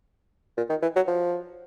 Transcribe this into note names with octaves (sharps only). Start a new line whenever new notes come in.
A#2
D#3
E3
F#3
F3